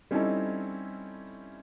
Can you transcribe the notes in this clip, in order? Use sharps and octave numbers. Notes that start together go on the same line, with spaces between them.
G3 C4 C#4 D#4 E4 A4